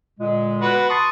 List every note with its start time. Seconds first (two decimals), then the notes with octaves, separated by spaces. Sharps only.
0.19 A#2 D3 G#3
0.62 F#4 B4 B5
0.89 A5 C6 C#6 D#6